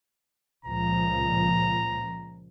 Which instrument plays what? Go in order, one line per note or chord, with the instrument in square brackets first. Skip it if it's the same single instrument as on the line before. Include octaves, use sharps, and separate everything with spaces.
[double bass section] C#2 A#2 F3 [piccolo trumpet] A#5